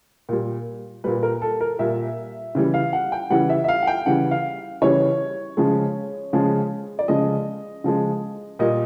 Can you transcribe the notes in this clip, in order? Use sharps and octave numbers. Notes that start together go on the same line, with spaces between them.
A#2 G3
A#2 G3 B4
A#4
A4
A#4
A#2 G3 E5
C#3 E3 G3
F5
F#5
G5
C#3 E3 G3 F#5
E5
E5
F5
F#5
G5
C#3 E3 G3 F#5
F5
C#3 E3 G3 C#5
C#3 F3 G#3
C#3 F3 G#3
D5
C#3 F3 G#3 D#5
C#3 F3 G#3
A#2 G3 D#5